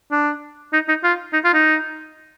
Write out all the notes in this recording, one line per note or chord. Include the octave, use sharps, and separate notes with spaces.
D4
D#4
D#4
F4
D#4
F4
D#4